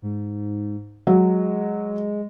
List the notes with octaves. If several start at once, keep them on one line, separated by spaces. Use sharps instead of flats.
G#2
F#3 G#3